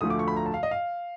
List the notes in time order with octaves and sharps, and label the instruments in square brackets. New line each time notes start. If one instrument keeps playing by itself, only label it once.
[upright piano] D2 D3 F3 A3 D#6
D6
C#6
B5
A#5
A5
F5
D#5
F5